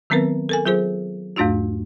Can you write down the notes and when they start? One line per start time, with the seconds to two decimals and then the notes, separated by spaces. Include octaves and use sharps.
0.10 D#3 F#3 B3 C4 A#4 B4
0.49 A4 A#4 G#5
0.65 F#3 F4 G#4 C5
1.36 E2 G#2 A3 D4 F4 F#4